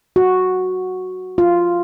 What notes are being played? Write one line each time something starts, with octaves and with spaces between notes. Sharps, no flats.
F#4
F4